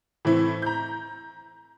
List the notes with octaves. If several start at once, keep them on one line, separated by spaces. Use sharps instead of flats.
A2 E3 C4 E4
A#5 G6